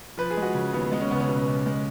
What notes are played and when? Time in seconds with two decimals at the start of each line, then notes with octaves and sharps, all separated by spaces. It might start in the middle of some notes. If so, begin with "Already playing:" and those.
0.17 F3 B4
0.30 G#4
0.37 G#3
0.42 F#4
0.55 C#3
0.73 D#2 B3
0.92 G#3 B3
1.01 C#4
1.11 C#2 B3
1.20 C#4
1.29 B2
1.47 C#2
1.66 G#3